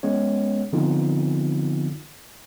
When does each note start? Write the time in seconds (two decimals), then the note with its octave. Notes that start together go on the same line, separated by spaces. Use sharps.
0.03 G#3 B3 C#4 C#5
0.73 D3 F3 B3 C4 D#4 F4